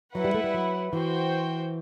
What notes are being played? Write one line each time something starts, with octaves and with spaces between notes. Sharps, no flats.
F#3 E4 B4 F#5
G3
A3
G3
F#3
E3 F#4 C5 G5